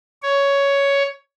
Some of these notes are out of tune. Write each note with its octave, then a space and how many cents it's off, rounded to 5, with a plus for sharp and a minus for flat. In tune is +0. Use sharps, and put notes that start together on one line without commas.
C#5 +10